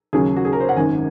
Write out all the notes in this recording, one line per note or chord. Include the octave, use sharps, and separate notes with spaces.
D#2 C#3 F#3 G#4
F#4
G#4
A#4
C5
F#5
G#1 F#2 D#3 G#5